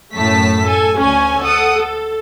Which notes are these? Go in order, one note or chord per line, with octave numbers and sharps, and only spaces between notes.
F#2 A2 A3 A5 B6
A4 G#5
D2 C#4 G#5
A4 F#5 D#6
A4